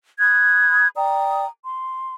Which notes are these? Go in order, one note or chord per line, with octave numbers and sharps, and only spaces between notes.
B5 D#6 F#6 G#6
D5 G5 A#5 D#6
C6